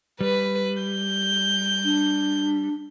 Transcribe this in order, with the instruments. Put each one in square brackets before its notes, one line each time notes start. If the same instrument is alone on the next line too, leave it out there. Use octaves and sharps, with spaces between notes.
[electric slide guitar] G3 [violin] B4
[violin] G6
[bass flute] D4